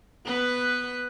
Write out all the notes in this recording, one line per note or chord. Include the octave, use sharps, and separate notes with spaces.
B3 B4